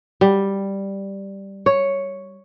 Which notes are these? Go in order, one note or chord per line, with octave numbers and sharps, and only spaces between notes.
G3
C#5